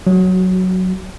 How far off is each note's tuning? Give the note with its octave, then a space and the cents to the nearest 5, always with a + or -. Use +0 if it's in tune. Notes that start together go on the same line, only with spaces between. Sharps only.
F#3 +0 F#4 +25